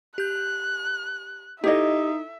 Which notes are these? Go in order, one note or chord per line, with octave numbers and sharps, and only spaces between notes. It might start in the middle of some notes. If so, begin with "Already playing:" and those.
G4 F#6 G6
D#4 E4 G4 A4 C#5 D#5 E5